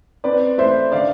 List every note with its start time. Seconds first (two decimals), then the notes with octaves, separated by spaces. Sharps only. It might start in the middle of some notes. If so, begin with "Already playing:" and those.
0.24 C4 B4 D5
0.58 A3 C5 E5
0.92 D3 D5 F5